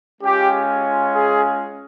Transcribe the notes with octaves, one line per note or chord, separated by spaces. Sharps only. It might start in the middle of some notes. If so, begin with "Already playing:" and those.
G#3 C#4 F4 G4
G#4